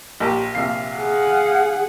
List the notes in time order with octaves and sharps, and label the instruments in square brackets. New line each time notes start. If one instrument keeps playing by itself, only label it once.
[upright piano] A#1 A#4 A5 [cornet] G4
[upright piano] A#1 C3 C7 [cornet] F5
[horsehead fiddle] G#4 F#5